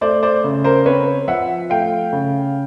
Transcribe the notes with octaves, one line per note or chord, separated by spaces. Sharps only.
A3 C5 D5
C5 D5
C#3
A#4 C5
C4 B4 C#5
F3 E5 F#5
A3 F5 G5
C#3